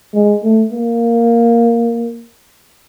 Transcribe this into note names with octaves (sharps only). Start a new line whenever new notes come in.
G#3
A3
A#3